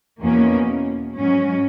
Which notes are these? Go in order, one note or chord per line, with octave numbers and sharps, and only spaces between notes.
E2 B2 A#3 C#4
G#2 F#3 C#4